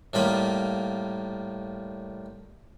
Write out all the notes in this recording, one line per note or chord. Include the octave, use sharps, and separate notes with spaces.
A2 G3 A#3 F4 B5